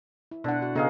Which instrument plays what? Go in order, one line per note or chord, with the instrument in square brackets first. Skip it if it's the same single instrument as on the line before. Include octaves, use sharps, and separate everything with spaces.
[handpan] E4
[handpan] B2 F#5 [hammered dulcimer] D3
[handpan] F#4
[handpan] C#3 B3 A4 [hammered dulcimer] D#4 G#4 F5